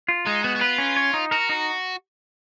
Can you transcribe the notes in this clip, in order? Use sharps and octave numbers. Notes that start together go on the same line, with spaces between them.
F4
G#3 D#4
B3 F#4
F#4
F4 B4
C#4
C#5
D#4
F#4 A#4
D#4